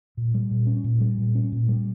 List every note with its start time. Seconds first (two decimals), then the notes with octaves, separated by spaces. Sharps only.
0.17 A#2
0.34 G3
0.51 A#2
0.67 C#4
0.84 A#2
1.01 G3
1.18 A#2
1.35 C#4
1.52 A#2
1.68 G3